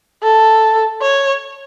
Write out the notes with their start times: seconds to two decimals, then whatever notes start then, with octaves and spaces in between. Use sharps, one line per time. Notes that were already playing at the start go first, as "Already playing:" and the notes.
0.23 A4
1.02 C#5